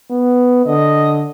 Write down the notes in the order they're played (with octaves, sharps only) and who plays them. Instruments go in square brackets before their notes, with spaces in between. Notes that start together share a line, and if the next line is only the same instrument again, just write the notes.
[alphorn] B3
[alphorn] D3 [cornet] D#5